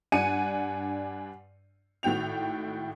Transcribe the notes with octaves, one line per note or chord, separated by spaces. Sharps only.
G2 D4 F#5 G#5 C#7 D#7
G#1 A2 F#4 G5 F7